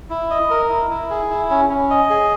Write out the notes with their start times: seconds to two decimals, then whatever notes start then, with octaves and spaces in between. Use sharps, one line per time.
0.10 E4
0.30 D#5
0.50 A#4
0.70 E4
0.91 E4
1.10 G#4
1.30 E4
1.50 C#4
1.70 C#4
1.90 D#5
2.10 G#4